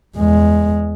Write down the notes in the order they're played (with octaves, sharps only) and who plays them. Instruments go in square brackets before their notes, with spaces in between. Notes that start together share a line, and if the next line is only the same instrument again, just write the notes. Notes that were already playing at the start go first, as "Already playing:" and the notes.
[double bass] E2 G#3